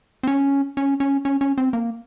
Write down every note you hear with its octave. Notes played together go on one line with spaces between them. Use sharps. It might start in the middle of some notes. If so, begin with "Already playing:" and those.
C4
C#4
C#4
C#4
C#4
C#4
C4
A#3